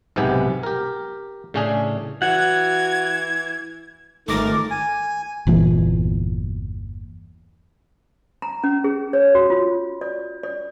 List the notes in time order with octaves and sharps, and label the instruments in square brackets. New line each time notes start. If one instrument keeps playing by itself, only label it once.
[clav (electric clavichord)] B1 G#2 C3 B3 G4 G#5
G4 A#4
A2 C#3 C#4 D4 G#4
[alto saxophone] E3 [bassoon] F#4 [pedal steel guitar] F#5 [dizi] G#6
[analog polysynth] G#1 A#4 A6 [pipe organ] D#3 A3 [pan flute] D6
[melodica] G#5
[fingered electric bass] G1 E2 A#2 E3
[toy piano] A#5
C#4
G#4
C#5
F#4
F4
D5
D5